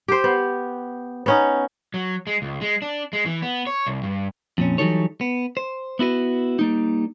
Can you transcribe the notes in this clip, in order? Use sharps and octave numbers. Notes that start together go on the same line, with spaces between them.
G4 C5
B3
B3 C#4 D#4
F#3
G#3
C#2
G#3
D4
G#3
E3
B3
C#5
C2
G2
F2 A#2 C#4
E3 F#3 G3 D#4 A4 C#5
B3
C5
B3 E4 F#4 B4
G3 A#3 D#4